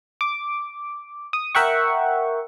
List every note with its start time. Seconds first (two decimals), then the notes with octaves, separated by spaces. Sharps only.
0.21 D6
1.33 D#6
1.55 A#4 E5 F#5 G5 C#6